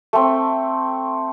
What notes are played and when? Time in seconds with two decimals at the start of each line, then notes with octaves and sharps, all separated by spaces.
0.13 A3 C4